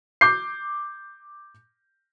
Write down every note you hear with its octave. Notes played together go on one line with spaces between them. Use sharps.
D6 G6 C7